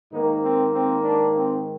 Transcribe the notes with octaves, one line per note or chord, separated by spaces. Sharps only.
G#2 D#3 A#3 D#4
C4
C4
D4
C4